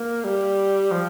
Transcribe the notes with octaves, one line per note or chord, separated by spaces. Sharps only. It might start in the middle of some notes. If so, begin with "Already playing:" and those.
Already playing: A#3
G3
F3